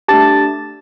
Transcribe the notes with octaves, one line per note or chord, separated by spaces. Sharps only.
A3 D4 G4 A5 A6